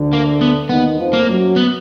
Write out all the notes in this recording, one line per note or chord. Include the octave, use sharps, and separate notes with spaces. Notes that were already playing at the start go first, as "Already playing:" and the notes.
Already playing: D2 D3
A#3
B3
D#2 D#3 B3
F2 F3
A#3
F#2 F#3
B3